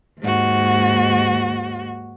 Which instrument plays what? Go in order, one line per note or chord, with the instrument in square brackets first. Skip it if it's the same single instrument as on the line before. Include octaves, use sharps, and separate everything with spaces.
[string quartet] D#2 G#2 F#4